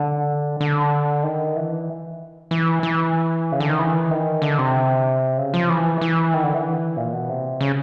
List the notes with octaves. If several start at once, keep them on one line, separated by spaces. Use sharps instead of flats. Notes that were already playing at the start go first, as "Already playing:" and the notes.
Already playing: D3
D3
D#3
E3
E3
E3
C#3
D3
D#3
E3
D#3
D3
C3
C#3
F3
E3
E3
D#3
D3
E3
A#2
B2
C3
C#3